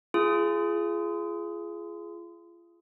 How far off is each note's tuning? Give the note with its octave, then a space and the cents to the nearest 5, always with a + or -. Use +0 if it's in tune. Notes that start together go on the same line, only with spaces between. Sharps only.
F4 -35 G#4 +10